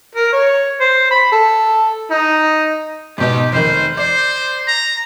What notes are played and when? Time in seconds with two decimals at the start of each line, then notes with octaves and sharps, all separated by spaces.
0.15 A#4
0.33 C#5
0.81 C5
1.11 B5
1.32 A4
2.11 D#4
3.18 G#2 B2 D#4 G4
3.52 F1 D#3 C5
3.97 C5 D5
4.67 A#5